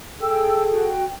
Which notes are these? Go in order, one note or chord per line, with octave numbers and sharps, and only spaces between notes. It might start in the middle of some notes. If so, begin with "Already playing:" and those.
G#4 A4 G5 E6
F#4 G5